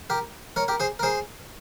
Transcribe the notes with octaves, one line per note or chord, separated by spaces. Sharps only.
G4 A#4
A#4 C#5
G4 A#4
G#4 C5
A#4
G#4 C5